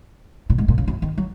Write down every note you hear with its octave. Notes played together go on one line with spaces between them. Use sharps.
A#2
G#2
A#2
C#3
F#2
D#3
F#3